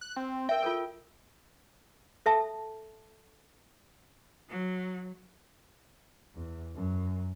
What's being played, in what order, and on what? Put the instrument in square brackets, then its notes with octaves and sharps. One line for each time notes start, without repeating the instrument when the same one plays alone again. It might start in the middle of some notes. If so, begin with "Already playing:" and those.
[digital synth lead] F#6
C4
[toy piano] A#4 E5 [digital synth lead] G5
[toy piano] F4 A4 A#4
A4 E5 A5
[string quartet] F#3
[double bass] E2
F#2